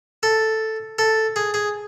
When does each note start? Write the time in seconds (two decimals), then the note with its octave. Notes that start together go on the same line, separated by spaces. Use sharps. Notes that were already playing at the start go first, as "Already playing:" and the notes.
0.23 A4
0.99 A4
1.36 G#4
1.54 G#4